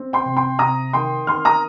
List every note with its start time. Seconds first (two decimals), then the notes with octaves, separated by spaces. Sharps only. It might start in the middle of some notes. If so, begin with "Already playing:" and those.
Already playing: C4
0.13 G5 C6
0.25 C3
0.37 G5 C6
0.59 C3 A#5 D#6
0.93 D#3 G5 C6
1.27 D#3 C6 F6
1.45 A#5 D#6